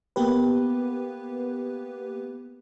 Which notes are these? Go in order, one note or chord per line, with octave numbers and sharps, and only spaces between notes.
A#3 B3 G4 B4